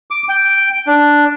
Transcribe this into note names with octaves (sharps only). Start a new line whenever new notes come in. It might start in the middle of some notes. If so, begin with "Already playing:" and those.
D6
G5
D4